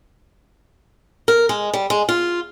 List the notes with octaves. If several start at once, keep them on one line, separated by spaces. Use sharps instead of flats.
A#4
G#3
G3
G#3
F4